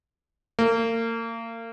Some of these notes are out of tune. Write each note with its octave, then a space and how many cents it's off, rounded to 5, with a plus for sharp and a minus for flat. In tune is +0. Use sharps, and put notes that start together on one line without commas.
A#3 -35